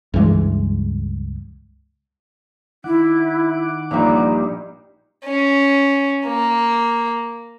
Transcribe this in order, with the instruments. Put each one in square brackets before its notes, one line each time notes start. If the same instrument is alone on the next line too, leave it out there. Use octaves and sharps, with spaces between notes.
[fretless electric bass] C#2 G2 E3 G#3
[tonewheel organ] D#3 F#5 D6 [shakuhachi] E4
[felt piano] A#1 A#2 [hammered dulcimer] G2 F#3 G3 [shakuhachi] D#4
[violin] C#4
A#3